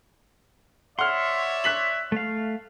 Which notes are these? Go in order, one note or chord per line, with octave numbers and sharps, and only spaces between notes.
C#5 D5 E5 F#5 C6 F6
F#6 B6 F#7
A3 F5